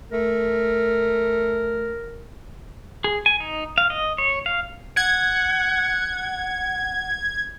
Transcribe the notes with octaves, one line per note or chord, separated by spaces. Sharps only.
A3 A#4
G#4
G#5
D#4
F5
D#5
C#5
F5
F#5 G#6